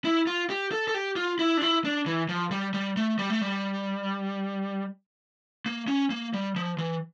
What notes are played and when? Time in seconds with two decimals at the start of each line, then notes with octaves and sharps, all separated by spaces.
0.05 E4
0.27 F4
0.50 G4
0.72 A4
0.88 A4
0.94 G4
1.16 F4
1.39 E4
1.57 D4
1.62 E4
1.85 D4
2.06 E3
2.29 F3
2.51 G3
2.74 G3
2.97 A3
3.19 G3
3.30 A3
3.41 G3
5.66 A#3
5.88 C#4
6.10 A#3
6.33 G3
6.56 F3
6.78 E3